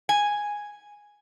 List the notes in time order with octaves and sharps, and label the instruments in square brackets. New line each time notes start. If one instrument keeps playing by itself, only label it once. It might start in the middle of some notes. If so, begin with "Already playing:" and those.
[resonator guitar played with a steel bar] G#5